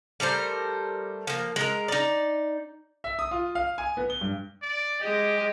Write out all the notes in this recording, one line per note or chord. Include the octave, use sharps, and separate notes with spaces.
G3 A3 A#4 C5
F3 A#3
G#3 A#4
D#4 D5
E5
D#6
F4
F5
G#5
B3
G7
G2
D5
G#3 G4 G#4 D#5